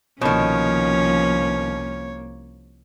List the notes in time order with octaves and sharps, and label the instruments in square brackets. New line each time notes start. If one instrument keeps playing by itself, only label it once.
[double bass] C2 A#3 [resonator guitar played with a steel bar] B2 D#3 [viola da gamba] F3 C#4 [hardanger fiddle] C#5